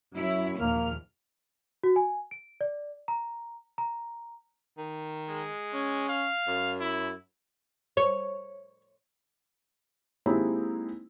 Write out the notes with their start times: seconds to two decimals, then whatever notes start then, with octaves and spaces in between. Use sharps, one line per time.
0.14 F#2 F#3 E4 C#5
0.59 A#1 D#2 A#3 F6
1.83 F#4
1.96 G#5
2.31 D7
2.61 D5
3.08 A#5
3.78 A#5
4.78 D#3
5.29 G#3
5.74 C#4
6.09 F5
6.47 F#2
6.80 E4
7.97 C#5
10.26 G#3 A#3 C4 D#4 E4 G4